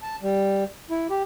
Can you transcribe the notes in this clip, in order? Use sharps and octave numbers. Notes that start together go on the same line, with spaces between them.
A5
G3
E4
G4